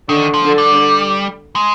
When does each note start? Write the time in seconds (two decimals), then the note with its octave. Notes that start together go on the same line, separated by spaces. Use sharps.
0.09 D3 D#3 D4
0.34 F3
0.45 D3 D4
0.58 G3
1.56 G#3